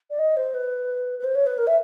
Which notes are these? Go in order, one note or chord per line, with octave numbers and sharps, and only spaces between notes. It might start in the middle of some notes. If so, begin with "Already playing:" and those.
D5
D#5
C5
B4
B4
C5
C#5
B4
A#4
E5